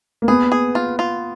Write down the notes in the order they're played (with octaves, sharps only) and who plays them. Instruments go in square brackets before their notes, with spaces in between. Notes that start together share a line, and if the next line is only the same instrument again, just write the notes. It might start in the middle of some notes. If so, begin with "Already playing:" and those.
[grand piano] A#3
[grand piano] B3 [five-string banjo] G#4
[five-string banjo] G#4
F4
F4